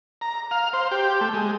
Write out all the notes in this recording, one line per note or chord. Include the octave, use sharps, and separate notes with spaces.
A#5
F5
C5
G4
A3
G#3